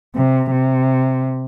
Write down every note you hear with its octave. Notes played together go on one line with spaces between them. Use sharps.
C3
C3